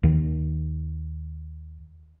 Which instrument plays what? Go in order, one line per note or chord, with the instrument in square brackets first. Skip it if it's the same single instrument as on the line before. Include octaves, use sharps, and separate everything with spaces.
[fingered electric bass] D#2 D#3